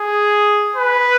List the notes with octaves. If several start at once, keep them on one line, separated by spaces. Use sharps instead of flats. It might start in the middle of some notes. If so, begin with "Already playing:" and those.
Already playing: G#4
B4